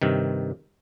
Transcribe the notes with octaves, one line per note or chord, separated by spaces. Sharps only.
G2 C3 D#3